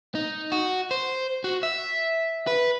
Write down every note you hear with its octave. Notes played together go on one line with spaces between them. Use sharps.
D#4
F#4
C5
F#4
E5
B4